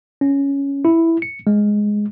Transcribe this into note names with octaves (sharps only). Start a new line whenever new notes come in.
C#4
E4
C#7
G#3